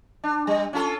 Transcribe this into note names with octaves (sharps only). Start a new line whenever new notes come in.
D4
G3
C#4 F4 A4